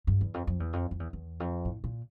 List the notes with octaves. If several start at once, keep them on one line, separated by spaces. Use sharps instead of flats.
G2
E2
F2
F2
E2
F2
F2
E2
E2
F2
A2
A#2